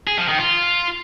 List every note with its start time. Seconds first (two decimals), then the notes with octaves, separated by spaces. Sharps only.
0.07 G#4
0.18 F3
0.28 D#3
0.39 F4